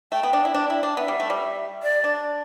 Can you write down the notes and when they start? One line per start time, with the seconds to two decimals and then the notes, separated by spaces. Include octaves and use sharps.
0.12 A3 G5
0.23 B3
0.33 D4
0.45 E4
0.54 D4
0.70 E4
0.83 D4
0.97 B3 E5
1.08 G3
1.20 A3
1.30 G3
1.83 D5
2.04 D4